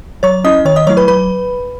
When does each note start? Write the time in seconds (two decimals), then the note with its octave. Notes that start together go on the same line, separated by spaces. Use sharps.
0.23 F#3 C#5 C#6
0.44 C#4 E4 D#5 D#6
0.65 D#3 C#5 C#6
0.76 D#5 D#6
0.87 F#3 A3 E4 C#5 C#6
0.97 B4 B5
1.08 F#3 B4 B5